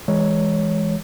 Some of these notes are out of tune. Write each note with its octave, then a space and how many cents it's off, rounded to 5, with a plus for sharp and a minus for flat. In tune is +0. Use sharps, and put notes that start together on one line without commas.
E3 +0 G#3 +0 C#5 +5